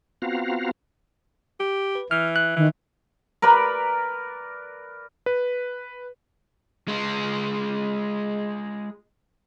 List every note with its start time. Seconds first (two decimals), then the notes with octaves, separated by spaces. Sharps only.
0.22 B3 C4 F4 F#4 F5 A#5
1.60 G4
1.95 B4
2.11 E3 F6
2.36 F#6
2.56 D#3 E3
3.42 A#4 B4 D5 B5
5.26 B4
6.88 G#3 F4